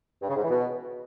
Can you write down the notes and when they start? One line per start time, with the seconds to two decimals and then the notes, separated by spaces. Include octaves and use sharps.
0.21 G2
0.29 C#3
0.36 G#2
0.43 E3
0.50 B2